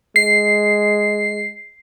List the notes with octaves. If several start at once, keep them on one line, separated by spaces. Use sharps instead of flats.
G#3 C7